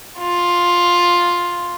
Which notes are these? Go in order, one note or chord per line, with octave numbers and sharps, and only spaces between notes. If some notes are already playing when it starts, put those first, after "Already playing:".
F4